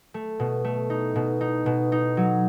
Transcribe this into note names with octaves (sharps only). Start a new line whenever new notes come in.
A3
B2
A3
D#4
B2
D#4
B2
D#4
F#3